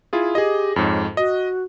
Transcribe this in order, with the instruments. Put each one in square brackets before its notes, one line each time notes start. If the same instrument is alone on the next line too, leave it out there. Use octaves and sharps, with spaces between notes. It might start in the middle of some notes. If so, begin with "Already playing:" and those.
[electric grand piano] E4 F4 G#4
[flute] G4 [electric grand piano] G#4 D#5
[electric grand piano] F2 G#2 [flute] C#5
[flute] F#4 [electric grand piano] D#5